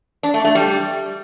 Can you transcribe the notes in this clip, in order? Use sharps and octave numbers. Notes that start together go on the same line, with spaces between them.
D4
A3
A3
G3